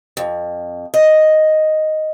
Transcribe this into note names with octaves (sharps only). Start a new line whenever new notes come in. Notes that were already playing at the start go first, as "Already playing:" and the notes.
F2
D#5